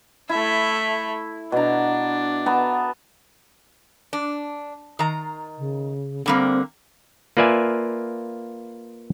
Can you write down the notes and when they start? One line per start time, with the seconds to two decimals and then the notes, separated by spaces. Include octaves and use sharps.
0.29 A3 E4 E5
1.52 B2 D4 A#5
2.46 B3 A5 A#5
4.13 D4
4.99 D#3 A#5
5.58 C#3
6.26 D3 G3 A#3 C4
7.37 A#3 F4 B4 D5 E5 G#5